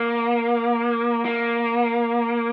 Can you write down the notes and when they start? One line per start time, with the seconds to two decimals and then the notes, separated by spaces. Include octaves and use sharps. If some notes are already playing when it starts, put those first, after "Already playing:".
Already playing: A#3
1.25 A#3